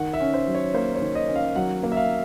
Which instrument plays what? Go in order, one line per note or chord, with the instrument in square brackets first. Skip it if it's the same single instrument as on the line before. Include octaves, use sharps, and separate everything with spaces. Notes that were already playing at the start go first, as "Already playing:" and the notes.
Already playing: [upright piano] D#3 [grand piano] F#5
[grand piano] E5
[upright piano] C#4
[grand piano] C5
[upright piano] F#3
[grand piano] C#5
[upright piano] A#3 [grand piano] C5
[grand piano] C#5
[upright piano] D#3
[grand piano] D#5
[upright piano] C#4
[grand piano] F5
[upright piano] F#3 [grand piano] F#5
[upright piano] A#3
[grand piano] E5
F5